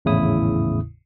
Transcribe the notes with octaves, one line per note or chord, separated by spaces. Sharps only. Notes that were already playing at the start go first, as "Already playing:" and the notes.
G#1 E2 A2 C#3 E4 D#6